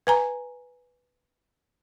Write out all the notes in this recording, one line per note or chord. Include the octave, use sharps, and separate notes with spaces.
B4 G#5 A#5